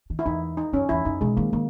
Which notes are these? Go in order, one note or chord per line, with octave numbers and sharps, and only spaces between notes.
D#3
E4
E2 D#4
D#4
F#2 C#4
E2 E4
F#2 D#4
B2 G#3
D#3 A#3
D#3 A#3